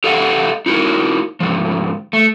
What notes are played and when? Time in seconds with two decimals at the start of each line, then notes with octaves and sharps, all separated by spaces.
0.04 G4 A4 D#5 F5 F#5
0.66 D#4 E4 F#4 A#4
1.40 G#2 D3 F3
2.13 A3